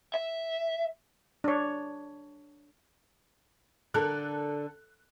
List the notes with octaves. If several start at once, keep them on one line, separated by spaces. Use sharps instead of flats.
E5
D4 C#5
D3 D4 A4 A#4 F#6